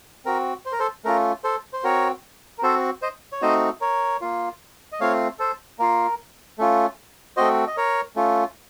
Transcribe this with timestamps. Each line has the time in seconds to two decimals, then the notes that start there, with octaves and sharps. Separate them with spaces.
0.25 C4 F#4 A#4
0.65 C5
0.72 A#4
0.79 A4 C5
1.05 A3 C#4 F4 A#4
1.44 A4 C5
1.73 C5
1.84 C4 F#4 A#4 C#5
2.58 A#4
2.63 C4 F#4 A4 C5
3.02 C5 D#5
3.32 C#5
3.42 A3 C4 D#4 F#4 C5 D#5
3.81 A#4 C#5
4.21 A#3 F4
4.92 D#5
5.00 A3 C4 F4 C#5 F5
5.39 A4 C5
5.79 A#3 F4 A#4
6.58 A3 C#4 F4
7.37 A3 C4 F#4 C5 D#5
7.67 D#5
7.77 A#4 C#5
8.16 A3 C#4 F4